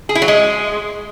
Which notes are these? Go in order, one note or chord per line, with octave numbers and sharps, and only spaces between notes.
G#4
E4
F#3
G#3